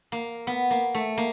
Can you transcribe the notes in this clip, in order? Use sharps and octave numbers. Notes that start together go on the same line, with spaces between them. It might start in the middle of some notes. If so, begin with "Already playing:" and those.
A#3
B3
A#3
A3
A#3